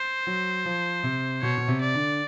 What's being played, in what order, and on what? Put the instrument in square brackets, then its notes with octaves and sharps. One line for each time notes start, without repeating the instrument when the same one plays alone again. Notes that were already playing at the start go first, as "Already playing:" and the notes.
Already playing: [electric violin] C5
[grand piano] F#3
F3
C3
[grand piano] B2 [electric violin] C#5
[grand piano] B2
C3
[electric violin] D5
[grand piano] D3